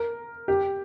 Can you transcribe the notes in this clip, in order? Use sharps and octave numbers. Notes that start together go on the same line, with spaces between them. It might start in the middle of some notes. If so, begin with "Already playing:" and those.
Already playing: A#4
G4